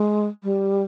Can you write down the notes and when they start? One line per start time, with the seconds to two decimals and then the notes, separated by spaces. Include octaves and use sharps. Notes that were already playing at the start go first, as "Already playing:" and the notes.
Already playing: G#3
0.43 G3